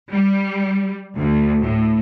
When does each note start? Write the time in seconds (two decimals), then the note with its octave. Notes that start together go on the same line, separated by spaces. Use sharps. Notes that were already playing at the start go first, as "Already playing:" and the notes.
0.11 G3
1.16 D2
1.63 A2